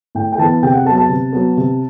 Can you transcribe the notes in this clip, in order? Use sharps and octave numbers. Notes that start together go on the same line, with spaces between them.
A2 G5
G5
E3 B3 A5
C3 G5
F#5
F#3 B3 A5
A5
C3
F#3 B3
C3